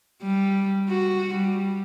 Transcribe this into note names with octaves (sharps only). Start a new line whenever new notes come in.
G3
F#4
G3